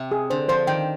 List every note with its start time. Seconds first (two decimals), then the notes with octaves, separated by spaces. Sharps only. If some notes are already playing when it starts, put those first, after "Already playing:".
Already playing: C3
0.11 G#4
0.30 D3 C5
0.49 F3 C5
0.67 D#3 G5